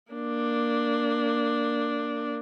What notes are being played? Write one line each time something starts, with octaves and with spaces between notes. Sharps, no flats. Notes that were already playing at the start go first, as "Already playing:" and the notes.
A#3 D4